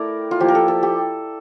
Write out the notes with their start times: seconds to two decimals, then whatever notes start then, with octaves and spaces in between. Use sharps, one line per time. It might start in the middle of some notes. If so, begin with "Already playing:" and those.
Already playing: A3 E4 A#4 D5 G5
0.31 F4
0.40 F3 A#3 E4 G4
0.48 A#4
0.55 A4
0.68 A4
0.83 G4